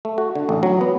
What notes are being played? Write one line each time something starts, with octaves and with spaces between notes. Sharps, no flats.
A3
F#4
D3
A1
F#3
B3